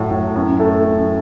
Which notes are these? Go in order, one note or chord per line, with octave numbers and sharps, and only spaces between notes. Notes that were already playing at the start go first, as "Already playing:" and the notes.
Already playing: A2 F#3
A2
F#2
A3
F#2